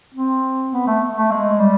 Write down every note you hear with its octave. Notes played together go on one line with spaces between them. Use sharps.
C4
B3
A3
A3
G#3
G3